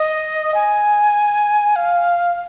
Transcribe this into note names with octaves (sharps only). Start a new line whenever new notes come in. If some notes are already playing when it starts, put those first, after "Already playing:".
Already playing: D#5
G#5
F5